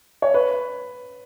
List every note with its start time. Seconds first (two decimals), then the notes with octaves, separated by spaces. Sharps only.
0.22 C#5
0.34 B4